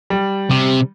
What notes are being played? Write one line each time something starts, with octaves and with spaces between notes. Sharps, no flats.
G3
C3